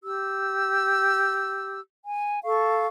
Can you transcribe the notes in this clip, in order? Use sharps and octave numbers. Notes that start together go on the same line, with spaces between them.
G4 E6
G#5
A4 F5 C#6